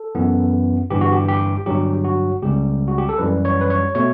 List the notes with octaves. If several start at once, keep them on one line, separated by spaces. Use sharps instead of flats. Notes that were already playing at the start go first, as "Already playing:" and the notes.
Already playing: A4
F#2 E3 B3
G1 G2 E3 G4
F#4
G4
G4
G1 G2 F#3 G4
F#4
C#2 C#3 G3 G4
F#4
G4
A4
F#2 E3 G3 B4
C#5
B4
C#5
B2 A3 C#5